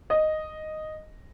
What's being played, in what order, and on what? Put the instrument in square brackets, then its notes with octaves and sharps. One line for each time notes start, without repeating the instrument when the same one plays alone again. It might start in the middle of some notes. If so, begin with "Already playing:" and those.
[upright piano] D#5